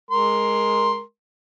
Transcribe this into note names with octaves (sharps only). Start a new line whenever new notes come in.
G#3 A#4 C6